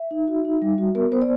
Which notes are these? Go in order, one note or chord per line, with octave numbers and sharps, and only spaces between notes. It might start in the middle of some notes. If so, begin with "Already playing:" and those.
Already playing: E5
D#4
F#4
D#4
G3
F#4
B3 A#4
B3 C5
D5